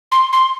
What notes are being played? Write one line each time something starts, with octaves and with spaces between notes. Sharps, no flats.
C6
C6